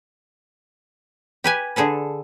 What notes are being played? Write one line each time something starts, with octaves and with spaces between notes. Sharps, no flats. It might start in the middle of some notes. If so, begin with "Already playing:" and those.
G4 B4 G#5
D3 G#4 A4 B4